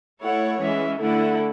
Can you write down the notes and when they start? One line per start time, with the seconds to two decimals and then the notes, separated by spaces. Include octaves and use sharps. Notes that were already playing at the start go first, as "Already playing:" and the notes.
0.22 A3 E4 A4 C#5 F#5
0.62 E3 G#3 C#4 E5
1.01 D3 A3 E4 A4 F#5